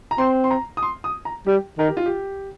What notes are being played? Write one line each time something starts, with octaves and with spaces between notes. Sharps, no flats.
A#5
C4 C6
C6
A#5
D#6
C6
D#6
A#5
G3 G4
D#3 A#4
G4
F4
G4